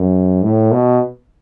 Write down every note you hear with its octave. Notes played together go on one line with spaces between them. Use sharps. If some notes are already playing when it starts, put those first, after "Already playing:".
Already playing: F#2
A2
B2